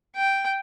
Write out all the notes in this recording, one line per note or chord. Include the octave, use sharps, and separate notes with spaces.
G5